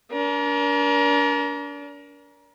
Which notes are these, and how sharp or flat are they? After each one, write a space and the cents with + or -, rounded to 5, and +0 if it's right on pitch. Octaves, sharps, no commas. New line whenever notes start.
D4 -35 A#4 +30